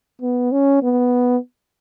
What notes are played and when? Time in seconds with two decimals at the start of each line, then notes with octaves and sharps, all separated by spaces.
0.21 B3
0.52 C#4
0.82 B3